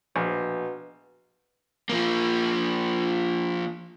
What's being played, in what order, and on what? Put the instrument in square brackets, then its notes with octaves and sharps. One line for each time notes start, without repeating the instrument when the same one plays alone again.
[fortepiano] A#1 [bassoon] B2
[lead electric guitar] F3 A#3